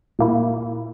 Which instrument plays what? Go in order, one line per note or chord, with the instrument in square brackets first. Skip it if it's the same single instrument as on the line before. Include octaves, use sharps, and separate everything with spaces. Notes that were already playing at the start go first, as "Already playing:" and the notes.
[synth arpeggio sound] A#2 A#3 E4